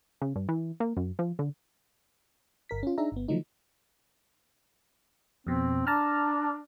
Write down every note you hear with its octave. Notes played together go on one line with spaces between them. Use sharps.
C#3
G2
E3
A#3
F#2
F3
D3
G1 A#4 B6
C#4 F4
D4 D#4 G#4 E5 A#5
G1 B3
D3 D#3 F3 F#3 A3 D#4
F2 B2 C4
D4 A5 A#5 F6